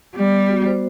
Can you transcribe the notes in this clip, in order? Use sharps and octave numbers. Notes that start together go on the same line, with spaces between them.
G3 B3
B3
F#4
C5